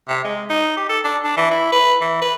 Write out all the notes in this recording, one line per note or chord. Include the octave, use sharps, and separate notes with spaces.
C3
G#3
D#4
G4
A4
D4
D4
E3
E4
B4
E3
B4